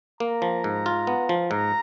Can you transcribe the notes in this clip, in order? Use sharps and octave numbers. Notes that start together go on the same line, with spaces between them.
A#3 A#5
F3
G#2
F4
B3
F3
G#2 A#5